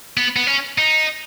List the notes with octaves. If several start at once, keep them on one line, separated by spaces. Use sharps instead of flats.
B3
B3
C#4
D#4